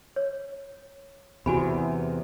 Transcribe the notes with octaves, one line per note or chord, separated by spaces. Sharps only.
C#5
E2 C3 F#4 G#5 B5